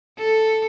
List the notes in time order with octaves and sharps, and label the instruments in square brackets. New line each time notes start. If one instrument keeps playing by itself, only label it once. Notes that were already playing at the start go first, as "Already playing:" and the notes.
[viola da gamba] A4